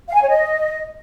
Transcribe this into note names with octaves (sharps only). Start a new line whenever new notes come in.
F5
G#5
C#5
D#5